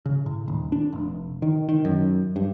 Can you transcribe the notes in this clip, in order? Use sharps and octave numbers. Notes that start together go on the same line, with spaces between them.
C#3
A2
D#1
D4
F1
D#3
D#3
F#2
G2